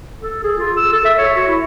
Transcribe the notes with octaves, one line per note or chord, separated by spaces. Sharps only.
A4
G#4
F4
E6
A4
E5
C#5
F#4
E4